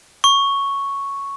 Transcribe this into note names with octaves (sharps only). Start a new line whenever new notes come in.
C#6